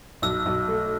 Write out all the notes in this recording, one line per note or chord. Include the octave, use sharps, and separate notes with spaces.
B1 E6
B1
A3